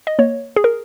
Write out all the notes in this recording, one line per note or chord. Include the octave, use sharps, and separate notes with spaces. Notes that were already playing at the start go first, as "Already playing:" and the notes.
D#5
A#3 C#5
G#4
A#4